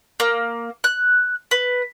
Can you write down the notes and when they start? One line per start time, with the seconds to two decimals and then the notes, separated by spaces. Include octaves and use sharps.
0.20 A#3
0.84 F#6
1.51 B4